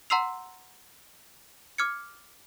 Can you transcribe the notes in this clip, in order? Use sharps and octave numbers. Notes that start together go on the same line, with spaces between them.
F#5 A#5 C6 E6 C7 F7
D6 F6 G#6 C#7